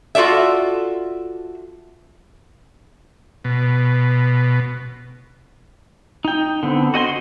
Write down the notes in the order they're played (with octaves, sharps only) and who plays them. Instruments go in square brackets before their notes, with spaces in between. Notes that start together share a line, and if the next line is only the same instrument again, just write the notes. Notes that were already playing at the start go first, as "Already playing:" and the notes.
[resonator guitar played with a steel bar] F4 F#4 A4 D5 E5
[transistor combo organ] B2
[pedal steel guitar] D#4 G5
D3 B3 C4
F#4 D#5 G5 C6